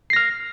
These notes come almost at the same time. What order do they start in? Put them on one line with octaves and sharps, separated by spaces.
C7 A#6 F6